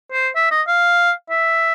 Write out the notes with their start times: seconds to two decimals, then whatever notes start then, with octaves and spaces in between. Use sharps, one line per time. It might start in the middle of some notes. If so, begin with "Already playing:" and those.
0.12 C5
0.35 E5
0.51 D#5
0.68 F5
1.30 E5